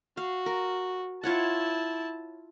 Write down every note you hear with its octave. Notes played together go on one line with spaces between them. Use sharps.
F#4 F5
A#4
E4 F4 C#5 F#5 A5